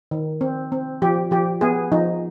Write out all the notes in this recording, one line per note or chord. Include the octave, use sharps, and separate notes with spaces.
D#3
C4
C4
F3 G4
F3 G4
B3 G#4
F3 D#4